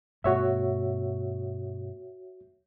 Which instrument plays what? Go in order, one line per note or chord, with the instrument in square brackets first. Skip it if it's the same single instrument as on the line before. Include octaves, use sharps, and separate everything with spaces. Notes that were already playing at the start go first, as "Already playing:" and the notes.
[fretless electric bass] G2 B2 A3 [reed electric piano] F#4 C#5 E5